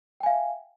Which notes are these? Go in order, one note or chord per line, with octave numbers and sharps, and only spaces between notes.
E5 F5 G5 G#5